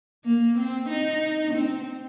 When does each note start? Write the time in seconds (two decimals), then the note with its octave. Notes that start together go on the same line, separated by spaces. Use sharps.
0.25 A#3
0.58 C4
0.89 D#4
1.54 C4